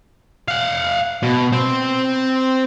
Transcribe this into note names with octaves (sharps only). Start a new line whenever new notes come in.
F5 F#5
B2
C4 C5